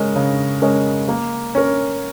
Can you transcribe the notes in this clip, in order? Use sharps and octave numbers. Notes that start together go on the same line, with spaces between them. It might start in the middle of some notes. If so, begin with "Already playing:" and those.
Already playing: C#3 G#3 C#4 A#4 D#5
C#3
G#3 C#4 A#4 D#5
A#3
C#4 A#4